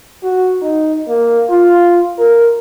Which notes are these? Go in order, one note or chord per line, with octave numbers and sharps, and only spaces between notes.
F#4
D#4
A#3
F4
A#4